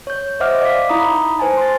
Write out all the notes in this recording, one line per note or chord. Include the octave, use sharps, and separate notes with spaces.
C#5 G6
C5 D#5 E5 F#5 D6 F6
D5 F5 D6 B6
D#4 E4 A#5 B5 D#6
B4 C5 G#5 A5
C6 A6